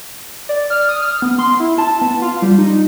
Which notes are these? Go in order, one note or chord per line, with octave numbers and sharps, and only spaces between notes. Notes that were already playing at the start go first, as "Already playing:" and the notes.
D5
F6
D#6
F6
B3
C6
E4
A5
B3
F4
G3
D#4